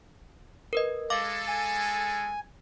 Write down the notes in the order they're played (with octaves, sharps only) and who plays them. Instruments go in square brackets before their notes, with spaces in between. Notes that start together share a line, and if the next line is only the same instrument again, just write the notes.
[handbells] A#4 B4 D#5
[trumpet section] G#3 A4 [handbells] F5 D6
[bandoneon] G#5